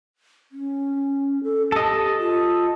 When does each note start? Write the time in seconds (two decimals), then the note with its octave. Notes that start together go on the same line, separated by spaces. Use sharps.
0.52 C#4
1.44 A4
1.72 G4 A4 D#5
2.19 F4